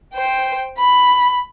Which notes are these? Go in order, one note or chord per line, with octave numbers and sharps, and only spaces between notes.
C5 G5
B5